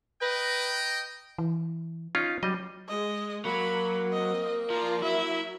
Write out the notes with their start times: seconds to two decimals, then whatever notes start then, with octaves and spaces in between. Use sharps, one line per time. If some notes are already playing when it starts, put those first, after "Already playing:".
0.22 B4 D#5 G5 A#5
1.38 E3
2.15 C#4 D#4 F4
2.43 F#3 G3 D#5
2.88 G#3 D#5
3.45 F#3 A#3 F#4 B5
4.13 C4 D#5
4.70 F3 F4 D5 A#5
5.02 F#3 E4 A#4 E5